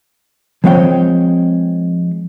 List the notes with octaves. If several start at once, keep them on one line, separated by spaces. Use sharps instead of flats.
F3 G#3 C4 C#5 F5 G5